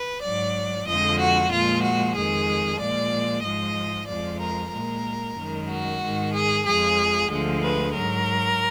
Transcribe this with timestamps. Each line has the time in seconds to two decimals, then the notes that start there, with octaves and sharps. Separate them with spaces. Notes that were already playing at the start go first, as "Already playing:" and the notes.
Already playing: B4
0.23 G#2 F#3 D5
0.88 F2 D3 F3 G#3 D#5
1.19 F#4
1.52 A#2 F3 G#3 F4
1.84 F#4
2.16 F2 D#3 G#3 G#4
2.80 A#2 F3 G#3 D5
3.45 G#2 F3 G#3 D#5
4.09 F2 F3 G#3 D5
4.41 A#4
4.73 A#2 G#3 A#4
5.37 F#2 D#3 G#3
5.70 F#4
6.03 G#2 D#3 G#3
6.34 G#4
6.66 F2 F3 G#3 G#4
7.31 D2 D3 F3 G#3
7.62 B4
7.95 G#2 F#3 A#4